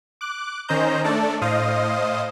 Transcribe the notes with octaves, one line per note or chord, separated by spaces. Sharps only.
D6 F#6
D#3 C#4 C5 D#5 A#5 G6
A3 D4 A4 D5
A2 C5 D#5 F5 D#6